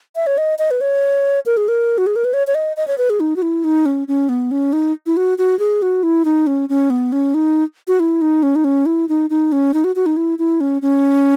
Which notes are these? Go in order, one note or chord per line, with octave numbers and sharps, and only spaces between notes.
E5
C#5
D#5
D#5
B4
C#5
A#4
G#4
A#4
F#4
G#4
A#4
B4
C#5
C#5
D#5
D#5
C#5
B4
G#4
D#4
F#4
E4
D#4
C#4
C#4
B3
C#4
D#4
E4
F#4
F#4
G#4
F#4
E4
D#4
C#4
C#4
B3
C#4
D#4
F#4
E4
D#4
C#4
D#4
C#4
E4
D#4
D#4
C#4
D#4
F#4
F#4
D#4
E4
E4
C#4
C#4